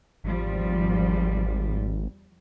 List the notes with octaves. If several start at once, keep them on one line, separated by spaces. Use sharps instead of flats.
G#1 E2 F3 G3